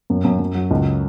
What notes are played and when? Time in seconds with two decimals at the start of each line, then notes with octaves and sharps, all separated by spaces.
0.10 F#2
0.24 F#2
0.39 F#2
0.55 F#3
0.71 C#2